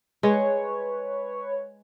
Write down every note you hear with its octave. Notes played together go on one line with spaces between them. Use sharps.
G#3 B4 C#5